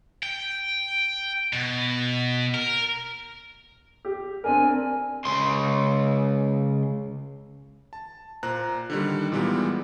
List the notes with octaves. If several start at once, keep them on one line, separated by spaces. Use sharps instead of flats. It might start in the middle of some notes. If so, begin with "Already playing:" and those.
G5
B2
A#4
G4
C4 D4 A#4 G#5
C#2 C6
A5
A#2 C5 A#5 F#6
D3 D#3 G3
A#2 E3 G3 G#3 B3